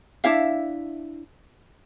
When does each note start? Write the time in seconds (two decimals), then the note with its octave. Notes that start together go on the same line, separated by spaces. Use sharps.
0.24 D4 E4 E5 F5